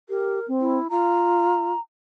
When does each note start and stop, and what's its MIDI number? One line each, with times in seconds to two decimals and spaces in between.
0.09 0.40 67
0.09 0.46 70
0.48 0.78 60
0.61 0.88 64
0.90 1.73 65
0.90 1.80 82